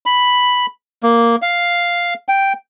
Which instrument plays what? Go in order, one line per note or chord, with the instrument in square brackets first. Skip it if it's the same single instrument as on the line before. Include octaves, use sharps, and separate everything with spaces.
[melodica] B5
A#3
F5
G5